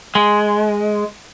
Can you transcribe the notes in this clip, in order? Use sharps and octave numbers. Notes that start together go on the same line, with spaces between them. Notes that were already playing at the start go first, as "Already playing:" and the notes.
G#3